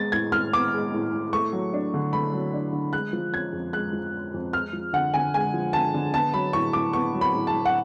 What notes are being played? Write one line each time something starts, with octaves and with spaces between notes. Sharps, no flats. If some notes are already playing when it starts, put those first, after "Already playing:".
Already playing: G#3 B3 A6
A2 G#6
A2 F6
B3 D6
G#3
A2
A2
A3 C#6
F#3
D4
D3
A3 B5
F#3
D4
D3
G#3 F#6
F3
C#4 G#6
F2
G#3 F#6
F3
C#4
F2
G#3 F6
F3
D3 F#5
D3 G#5
G#3 G#5
F3
D3 A5
D3
B3 A5
F#3 B5
A2 C#6
A2 D6
B3 C#6
F#3
B5
A2
A5
A2
F#5